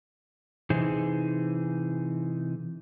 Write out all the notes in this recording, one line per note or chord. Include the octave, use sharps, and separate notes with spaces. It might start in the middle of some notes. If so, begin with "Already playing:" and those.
C3 E3 D#4 G#4 C5